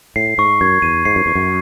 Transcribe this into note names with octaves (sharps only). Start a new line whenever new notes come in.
A2 C7
G#2 C#6
F#2 G#6
E2 D#7
G#2 C7
F#2
E2 C#6
F#2